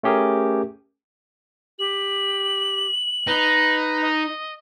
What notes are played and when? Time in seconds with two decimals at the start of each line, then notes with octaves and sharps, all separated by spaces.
0.03 A3 C#4 G4 G#4 A#4
1.79 G4 F#7
3.27 D#4 B4
4.02 D#5